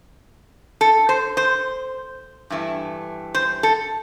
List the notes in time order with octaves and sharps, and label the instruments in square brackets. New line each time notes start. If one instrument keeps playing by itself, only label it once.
[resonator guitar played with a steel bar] A4
C5
C5
G2 E3 A3
C5
A4